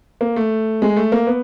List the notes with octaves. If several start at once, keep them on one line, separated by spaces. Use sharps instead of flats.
A#3
A3
G#3
A3
A#3
B3